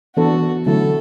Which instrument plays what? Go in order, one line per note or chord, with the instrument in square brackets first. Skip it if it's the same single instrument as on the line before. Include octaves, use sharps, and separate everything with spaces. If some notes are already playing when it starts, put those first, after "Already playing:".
[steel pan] E3 B3 D4 A4 [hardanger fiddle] F#4
[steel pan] D3 F#3 A3 E4 [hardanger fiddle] A4